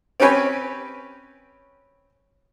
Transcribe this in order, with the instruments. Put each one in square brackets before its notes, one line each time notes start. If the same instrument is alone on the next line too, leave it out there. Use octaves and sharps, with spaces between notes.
[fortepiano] C4 C#4 G4 B4 C#5 G#5